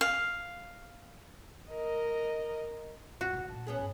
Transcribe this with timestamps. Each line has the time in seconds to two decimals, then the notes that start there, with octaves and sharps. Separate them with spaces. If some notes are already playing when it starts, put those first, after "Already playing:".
0.01 F5
1.71 A#4 D#5
3.21 C#2 F#4 F#5
3.33 D#2 C3
3.48 A1 A#2 A5
3.67 B3 C#4 G#4
3.79 G2 C4